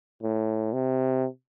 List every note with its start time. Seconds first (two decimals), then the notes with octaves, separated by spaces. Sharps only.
0.23 A2
0.73 C3